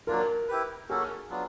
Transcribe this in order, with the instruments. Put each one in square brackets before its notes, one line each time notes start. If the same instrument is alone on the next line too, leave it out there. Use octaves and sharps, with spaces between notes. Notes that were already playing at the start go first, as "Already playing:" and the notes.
[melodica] F#3 A#3 D4 F4 [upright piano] A#4
[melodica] E4 G4 B4
[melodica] A#3 C#4 F#4 A4 [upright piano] G#4
[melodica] F#3 B3 D4 F4